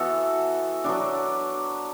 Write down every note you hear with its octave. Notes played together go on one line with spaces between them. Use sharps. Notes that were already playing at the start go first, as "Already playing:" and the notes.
Already playing: E3 B3 F#4 A4
F#3 B3 D4